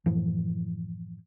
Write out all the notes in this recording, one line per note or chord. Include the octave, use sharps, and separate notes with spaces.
F#2 A2 E3 F3